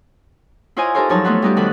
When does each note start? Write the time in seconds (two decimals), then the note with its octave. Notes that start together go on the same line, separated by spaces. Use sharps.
0.77 E4 F4 C5 C#5 D#5 G#5
0.95 D#4 G4 A4 A#4 C5 C#5
1.09 G2 F3 F#3 D#4 C#5 A5
1.24 A3 B3 D#4 F4 F#4 B4
1.42 G3 B3 D#4 F#4 G4
1.57 F2 D#3 F#4 A4 B5 F#6